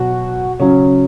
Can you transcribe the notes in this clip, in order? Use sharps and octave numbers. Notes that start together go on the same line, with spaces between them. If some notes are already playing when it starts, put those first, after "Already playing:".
Already playing: B2 F#3 F#4
C#3 F#3 C#4